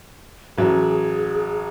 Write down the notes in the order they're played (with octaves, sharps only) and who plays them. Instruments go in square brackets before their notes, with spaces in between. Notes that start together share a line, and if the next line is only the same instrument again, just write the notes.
[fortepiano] A1 F#3 [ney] G#4